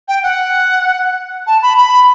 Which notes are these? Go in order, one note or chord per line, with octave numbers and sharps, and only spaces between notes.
G5
F#5
A5
B5
B5